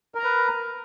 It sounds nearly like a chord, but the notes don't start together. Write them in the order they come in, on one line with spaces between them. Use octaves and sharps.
A#4 A#5 B4